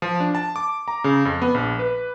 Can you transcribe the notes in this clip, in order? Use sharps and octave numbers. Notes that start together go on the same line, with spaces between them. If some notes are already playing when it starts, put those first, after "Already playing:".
F3
D4
A5
D6
A#5
C#3
F2
B3
A#1
B4